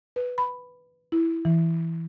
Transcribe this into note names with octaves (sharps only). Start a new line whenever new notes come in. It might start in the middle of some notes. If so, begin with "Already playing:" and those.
B4
B5
E4
E3